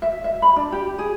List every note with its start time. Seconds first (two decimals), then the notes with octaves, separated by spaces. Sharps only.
0.02 E5
0.24 E5
0.42 B5
0.56 D4
0.72 G4
0.99 G#4